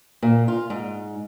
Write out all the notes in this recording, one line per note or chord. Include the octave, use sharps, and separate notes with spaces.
A#2
F4
G#2